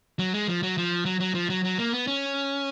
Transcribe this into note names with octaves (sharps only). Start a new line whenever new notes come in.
F#3
G#3
F3
F#3
F3
F#3
F#3
F3
F#3
F#3
A#3
B3
C#4